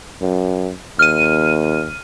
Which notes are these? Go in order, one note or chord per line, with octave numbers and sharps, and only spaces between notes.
F#2
D#2 F6 D#7